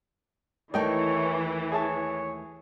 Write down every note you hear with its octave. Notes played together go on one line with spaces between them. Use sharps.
D#2 E3 A3 D#4 A#4 C#5 D5 G5
G#4 C#5 E5 A5